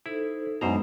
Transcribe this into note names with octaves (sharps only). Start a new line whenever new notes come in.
D#4 E4 A4 C5
F#2 B2 G#3 D4 D#4 C5 A#5